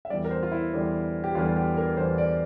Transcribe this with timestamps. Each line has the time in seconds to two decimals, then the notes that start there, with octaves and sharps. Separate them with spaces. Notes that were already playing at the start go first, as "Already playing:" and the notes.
0.05 E5
0.10 E2 D3 G3 D5
0.25 A#4
0.31 C5
0.43 F4
0.52 E4
0.73 E2 D3 G3
1.24 G4
1.35 E2 D3 G3 F4
1.57 G4
1.77 A#4
1.97 E2 D3 G3 C5
2.18 D5